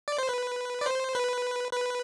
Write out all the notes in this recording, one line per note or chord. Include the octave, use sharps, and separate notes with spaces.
D5
C5
B4
D5
C5
B4
B4